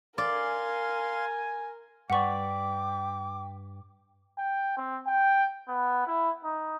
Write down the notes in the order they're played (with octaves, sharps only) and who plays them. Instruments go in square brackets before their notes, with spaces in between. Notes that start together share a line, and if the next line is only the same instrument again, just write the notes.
[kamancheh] A#4 [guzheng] D5 [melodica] F5 C6 [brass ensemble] G#5
[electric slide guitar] G2 B4 D5 [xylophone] F#5 C#6 [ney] G5 [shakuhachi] D6
[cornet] G5
C4
G5
B3
E4
D#4